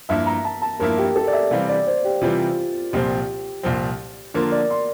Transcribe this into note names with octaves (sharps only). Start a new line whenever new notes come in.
G2 F3 A#3 E4 E5
A#5
A5
A5
G2 F3 A#3 E4 A#4
G4
A4
D5
E5
C3 E3 G3 C4 F5
D5
C5
G4
C3 E3 G3 C4 F4
C2 A#2 F3 C4 G4
C2 A#2 F3 C4
D3 F3 A#3 F4 A#4
D5
C6